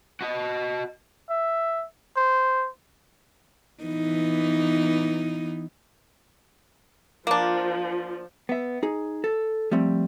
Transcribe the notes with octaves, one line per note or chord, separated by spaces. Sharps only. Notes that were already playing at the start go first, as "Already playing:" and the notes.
F#4 D#5
E5
C5
E3 B3 D#4
F3 A#3 D4
B3 E5
D#4 G#4
A4
F3 G3 A3 C4